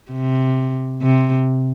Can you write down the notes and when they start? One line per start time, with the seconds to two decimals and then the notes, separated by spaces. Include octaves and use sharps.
0.11 C3
1.02 C3